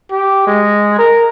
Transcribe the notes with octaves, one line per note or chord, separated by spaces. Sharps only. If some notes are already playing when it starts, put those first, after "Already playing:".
G4
G#3
A#4